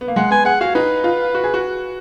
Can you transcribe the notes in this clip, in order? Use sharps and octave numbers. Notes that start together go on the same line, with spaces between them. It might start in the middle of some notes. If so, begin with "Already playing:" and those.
B3
A#3
G#3 F#5
B3 G#5
G#4 F#5
F#4 F5
D#4 B4
F4
F#4
G#4
F#4